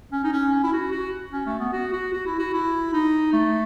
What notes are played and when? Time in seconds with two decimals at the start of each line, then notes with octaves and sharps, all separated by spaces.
0.12 C#4
0.24 D#4
0.32 C#4
0.52 C#4
0.64 E4
0.73 F#4
0.92 F#4
1.33 C#4
1.46 A3
1.60 B3
1.73 F#4
1.93 F#4
2.13 F#4
2.26 E4
2.39 F#4
2.53 E4
2.93 D#4
3.33 A3